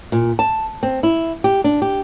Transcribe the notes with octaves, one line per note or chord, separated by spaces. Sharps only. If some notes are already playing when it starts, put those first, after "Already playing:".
A#2
A5
C4
E4
G4
D4
G4